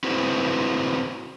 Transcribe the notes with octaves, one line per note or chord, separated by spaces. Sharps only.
C4 E4 F#4 G#4 B4 C5